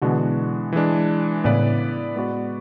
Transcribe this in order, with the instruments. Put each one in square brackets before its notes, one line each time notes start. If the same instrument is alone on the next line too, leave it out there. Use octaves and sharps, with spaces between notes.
[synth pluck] B2 D3 [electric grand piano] E3 G#3 B3 D4 F#4
[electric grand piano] E3 G#3 D4
[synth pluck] A2 C#3 [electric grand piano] B3 E4 B4 D5
[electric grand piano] G#3 B3 F#4 B4 D5